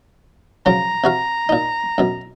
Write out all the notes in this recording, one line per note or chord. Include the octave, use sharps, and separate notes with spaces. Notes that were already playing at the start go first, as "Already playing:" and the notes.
C#3 F3 F#3 A#5
C3 F#4 F5
A#2 D#4
F#2 B2